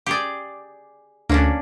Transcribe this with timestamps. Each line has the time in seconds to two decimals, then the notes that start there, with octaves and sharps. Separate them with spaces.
0.06 G4 G#4 D5
1.29 D2 A#3 C#4 D4